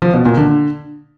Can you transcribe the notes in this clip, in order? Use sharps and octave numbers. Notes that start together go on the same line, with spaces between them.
F3
B2
A#2
D3